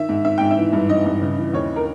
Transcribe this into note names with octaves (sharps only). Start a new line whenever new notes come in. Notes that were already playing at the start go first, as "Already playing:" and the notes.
Already playing: D#3 E5
G#2
D#3 E5
G#2 G5
E5
E3
G2
E3 D#5
G2
C#3
E3
D#2 C#5
A#4